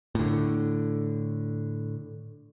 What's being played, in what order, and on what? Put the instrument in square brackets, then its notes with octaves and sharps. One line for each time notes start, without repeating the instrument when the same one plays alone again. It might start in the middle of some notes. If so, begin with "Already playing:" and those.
[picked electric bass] A2 D3